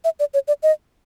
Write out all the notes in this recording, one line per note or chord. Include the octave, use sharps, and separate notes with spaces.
E5
D5
C#5
D5
D#5